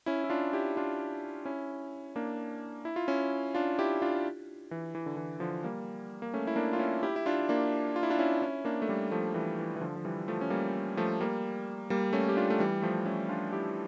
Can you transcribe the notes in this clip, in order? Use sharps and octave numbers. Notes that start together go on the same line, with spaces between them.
C#4 E4
E4
D4 F4
E4 G4
D4 F4
C#4 E4
A#3 D4
E4
F4
C#4 E4
D4 F4
E4 G4
D4 F4
E3
E3
D3
E3
D3 F3
G3 A#3
A#3
A3 C#4
E4
A#3 D4
F4
C#4 E4
E4 G4
E4
D4 F4
A#3 D4
F4
E4
D4 F4
C#4 E4
C#4 E4
A#3 D4
A3
G3 A#3
F3 A3
E3 G3
E3
E3
D3 F3
F3
E3 G3
F3 A3
C#4
G3 A#3
F3 A3
G3 A#3
G3 A#3
A3 C#4
G4
D4 F4
A3
E3 G3
F3 A3
A3 C#4
D4 F4
E4 G4